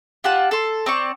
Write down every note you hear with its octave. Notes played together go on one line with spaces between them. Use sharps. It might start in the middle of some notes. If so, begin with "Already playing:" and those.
F4 G4 F#5 A5
A4 C6
C4 D5 C#6